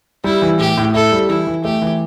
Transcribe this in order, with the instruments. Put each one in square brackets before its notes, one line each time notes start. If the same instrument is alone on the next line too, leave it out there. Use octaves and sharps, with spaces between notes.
[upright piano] G3 [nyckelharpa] E4
[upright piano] E3
[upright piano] A2 [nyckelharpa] G4
[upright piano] A2
[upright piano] E4 [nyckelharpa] A4
[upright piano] G3
[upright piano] E3 [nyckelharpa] E4
[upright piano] E3
[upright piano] A3 [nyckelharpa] G4
[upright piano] E3